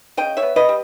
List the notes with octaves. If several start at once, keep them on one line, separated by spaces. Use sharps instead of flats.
C#3 D#5 G5
C#5 E5
B3
B4 D#5
G3